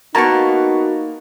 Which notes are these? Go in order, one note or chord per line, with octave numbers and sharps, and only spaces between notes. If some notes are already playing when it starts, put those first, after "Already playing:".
A#3 B3 D#4 F#4 A5 A#5 C#6